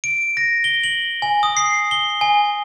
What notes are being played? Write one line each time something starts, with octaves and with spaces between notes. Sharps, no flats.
D7
A#6
G7
F#7
G#5
D#6
C7
G7
G#5